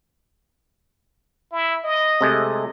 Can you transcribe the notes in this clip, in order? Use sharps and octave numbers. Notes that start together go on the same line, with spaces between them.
E4
D#5
C3 G#3 A3